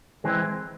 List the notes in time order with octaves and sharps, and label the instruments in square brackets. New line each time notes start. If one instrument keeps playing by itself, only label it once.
[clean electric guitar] E3 G#3 C4